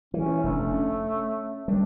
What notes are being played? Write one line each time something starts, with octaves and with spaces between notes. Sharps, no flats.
E3 C#4
F1 A2 A3 D4
C#4
G3 D4